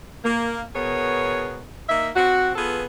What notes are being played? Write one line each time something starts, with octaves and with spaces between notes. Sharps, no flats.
A#3
B2 B3 G#4 A#4 C#5
A#3 D#4 E5
C4 F#4
B3 F4 G#4 A4 B4